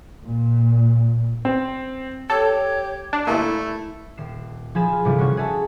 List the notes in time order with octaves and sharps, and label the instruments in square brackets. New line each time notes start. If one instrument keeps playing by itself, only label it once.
[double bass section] A#2
[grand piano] C4
[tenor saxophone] G4 [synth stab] A4 [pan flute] C#5
[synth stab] D4
[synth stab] G1 A#2 [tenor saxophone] A3 [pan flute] E4
[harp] D#1 C7 E7
F3 G#4 G#5 B5 A6 E7
F4
G1 C3 E3 G3 F4 F5
C#4 F4 F#4 B4 C#5
G#4 C#5 E5 A5 D#6